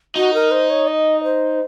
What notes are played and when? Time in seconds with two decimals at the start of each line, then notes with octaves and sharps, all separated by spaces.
0.16 D#4 F#4
0.34 A#4
0.51 C5
0.70 C#5
0.88 D#5
1.24 C5